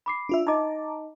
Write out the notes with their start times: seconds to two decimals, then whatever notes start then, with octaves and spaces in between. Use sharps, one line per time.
0.06 B5 D6 C7
0.29 D4 F4 E5
0.47 D#4 D#5 A5 A#5 D6